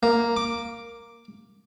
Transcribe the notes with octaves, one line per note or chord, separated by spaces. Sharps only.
A#3
D6